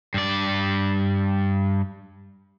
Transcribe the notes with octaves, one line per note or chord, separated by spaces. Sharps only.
G2 D5